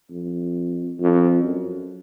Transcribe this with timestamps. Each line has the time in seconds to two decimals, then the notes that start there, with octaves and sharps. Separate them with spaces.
0.10 F2
1.00 F2
1.43 F#2